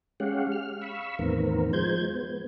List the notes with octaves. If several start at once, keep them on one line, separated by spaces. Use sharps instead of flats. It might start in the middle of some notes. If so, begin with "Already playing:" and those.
G#3 C#4 G4 F5 F#5
F6
F5 B5 C#6 E6
E2 A2 D#3 B3 C4 A#4
F3 G#3 C5 G6 G#6
B3